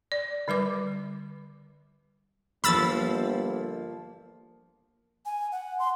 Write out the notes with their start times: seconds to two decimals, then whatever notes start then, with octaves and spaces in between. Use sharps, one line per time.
0.12 D5
0.48 D3 G3 B4 D6
2.64 G1 F3 A#3 B5 E6 A6
5.26 G#5
5.52 F#5
5.79 C6